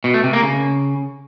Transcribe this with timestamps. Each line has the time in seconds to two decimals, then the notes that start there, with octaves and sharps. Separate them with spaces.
0.04 B2
0.14 A3
0.24 C3
0.33 A#3
0.43 C#3